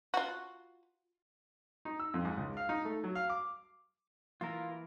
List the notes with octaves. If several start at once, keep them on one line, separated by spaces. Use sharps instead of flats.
F4 F#4
D#4
E6
F2
G#2
C#2
F5
D#4
A3
F#3
F5
D6
E3 A#3 E4 F4 A#4